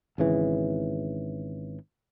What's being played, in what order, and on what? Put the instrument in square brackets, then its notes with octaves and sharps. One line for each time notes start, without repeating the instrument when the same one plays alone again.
[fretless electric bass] G#1 C#3 E3